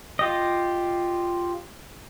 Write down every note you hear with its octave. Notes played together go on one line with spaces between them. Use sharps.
F4 G4 D#5